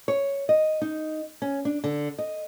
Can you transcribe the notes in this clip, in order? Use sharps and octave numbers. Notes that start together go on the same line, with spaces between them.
C#5
D#5
D#4
C#4
D4
D3
D#5